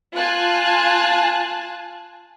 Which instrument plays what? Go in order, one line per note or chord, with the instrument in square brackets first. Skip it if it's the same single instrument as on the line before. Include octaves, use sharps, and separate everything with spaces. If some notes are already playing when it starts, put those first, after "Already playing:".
[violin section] F4 G#5 A5 F#6